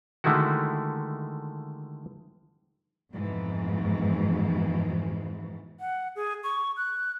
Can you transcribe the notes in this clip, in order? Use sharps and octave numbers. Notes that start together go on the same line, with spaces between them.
D3 D#3 G#3 A3 E4 F#4
F2 G#2 B2 E3
F#5
G#4
C#6
F#6